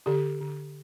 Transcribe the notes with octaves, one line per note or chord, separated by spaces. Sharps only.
D3 G4
D3